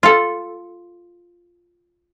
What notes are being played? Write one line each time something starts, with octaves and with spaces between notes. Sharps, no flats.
F4 A4